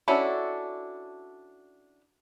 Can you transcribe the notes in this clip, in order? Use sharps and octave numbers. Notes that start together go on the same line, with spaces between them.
C#4 D4 E4 F#4 A4